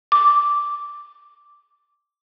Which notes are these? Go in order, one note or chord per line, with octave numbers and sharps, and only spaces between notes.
D6